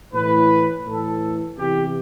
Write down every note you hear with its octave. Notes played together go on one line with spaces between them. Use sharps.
A2 E3 B4
A2 E3 A4
E2 C3 E3 G4